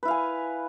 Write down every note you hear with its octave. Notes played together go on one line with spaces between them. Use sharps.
E4 B4 F5 G#5